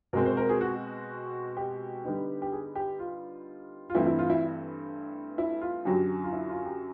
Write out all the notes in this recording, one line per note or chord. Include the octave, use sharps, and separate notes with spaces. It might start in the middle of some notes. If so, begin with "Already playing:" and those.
B2 G#3 C4 A#4
C5
A#4
G#4
F#4
G4
D3 G3 B3 D#4
G4
G#4
G4
F4
F4
G2 E3 A3 C4 E4
E4
F4
E4
E4
F4
F#2 D3 F#3 G4
F4
E4
F4
G4